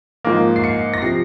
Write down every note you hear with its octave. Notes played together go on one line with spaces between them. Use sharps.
G#2 F3 A#3
C7
C#7
A#6
C3 F3 C7